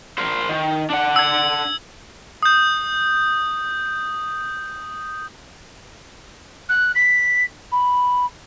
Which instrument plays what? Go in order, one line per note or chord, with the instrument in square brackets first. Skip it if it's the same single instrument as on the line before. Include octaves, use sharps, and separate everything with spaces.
[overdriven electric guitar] A#4 C5
D#3
D4 F#5
[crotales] E6 G#6
D#6 G6
[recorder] F#6
B6
B5